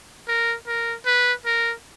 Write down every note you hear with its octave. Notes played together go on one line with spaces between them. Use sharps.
A#4
A#4
B4
A#4